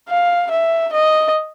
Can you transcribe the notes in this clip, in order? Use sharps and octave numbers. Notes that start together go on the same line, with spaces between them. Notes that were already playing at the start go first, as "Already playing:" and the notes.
F5
E5
D#5